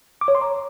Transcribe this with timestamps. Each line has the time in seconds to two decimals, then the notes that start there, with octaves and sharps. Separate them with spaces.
0.21 D6
0.28 C#5
0.35 C6
0.41 A#5